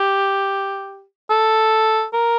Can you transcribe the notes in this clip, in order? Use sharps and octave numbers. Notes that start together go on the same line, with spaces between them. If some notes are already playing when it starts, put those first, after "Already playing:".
Already playing: G4
A4
A#4